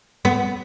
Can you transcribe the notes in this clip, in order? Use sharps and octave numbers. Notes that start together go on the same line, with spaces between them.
B3